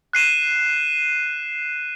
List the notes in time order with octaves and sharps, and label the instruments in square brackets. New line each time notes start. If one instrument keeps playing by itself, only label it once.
[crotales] F#6 C7 D#7 E7